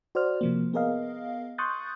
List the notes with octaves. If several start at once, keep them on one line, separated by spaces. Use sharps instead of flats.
F#4 C5 D5 F6
C3 F3 A#3
B3 G#4 A#4 D#5 F5
C6 C#6 D#6 F#6 G6 A6